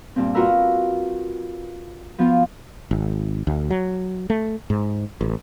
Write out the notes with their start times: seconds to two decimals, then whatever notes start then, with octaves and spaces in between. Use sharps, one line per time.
0.16 G2 A#2 C4
0.34 F4 F#4 A#4 B4 A#5 E6
2.18 F3 B3 F4
2.91 G#1
3.47 D2
3.70 F#3
4.30 A3
4.70 G#2
5.21 A1